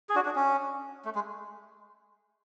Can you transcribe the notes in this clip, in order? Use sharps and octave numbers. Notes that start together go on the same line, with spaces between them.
G#4
D4 F#4
D4
C#4
A3
G#3